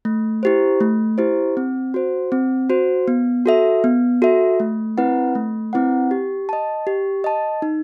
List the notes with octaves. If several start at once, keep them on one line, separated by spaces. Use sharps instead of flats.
A3
E4 G4 C5
A3
E4 G4 C5
C4
F#4 C5
C4
F#4 C5
B3
F#4 A4 E5
B3
F#4 A4 E5
A3
C4 E4 B4 F#5
A3
C4 E4 B4 F#5
G4
D#5 A5
G4
D#5 A5
D#4